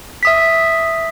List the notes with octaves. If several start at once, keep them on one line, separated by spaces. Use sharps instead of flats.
E5 D#6 B6